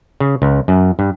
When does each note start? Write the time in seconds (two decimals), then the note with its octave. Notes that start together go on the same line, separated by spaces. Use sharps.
0.20 C#3
0.42 C#2
0.68 F#2
0.99 G2